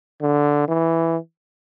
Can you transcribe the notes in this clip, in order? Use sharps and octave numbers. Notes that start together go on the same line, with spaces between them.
D3
E3